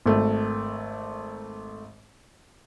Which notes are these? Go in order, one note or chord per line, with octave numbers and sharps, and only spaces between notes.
G#1 A3